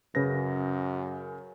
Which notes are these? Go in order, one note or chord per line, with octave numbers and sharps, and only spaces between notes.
F#2 C#3 B4 A#6